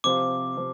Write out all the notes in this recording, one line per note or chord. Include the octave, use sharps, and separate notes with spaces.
C3 F3 C4 F4 D6
C3 F3